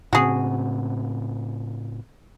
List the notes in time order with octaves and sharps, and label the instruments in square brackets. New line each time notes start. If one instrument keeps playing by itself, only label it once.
[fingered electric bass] A2 C#3 C4 [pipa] F#4 G#4